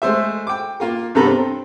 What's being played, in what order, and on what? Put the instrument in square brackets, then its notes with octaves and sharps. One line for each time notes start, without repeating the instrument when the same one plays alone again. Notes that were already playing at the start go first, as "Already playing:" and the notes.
[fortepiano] G#3 A3 C5 E5
G5 D6
A#3 F4 A#4
G2 C3 B3 A4 A#5 B5
C4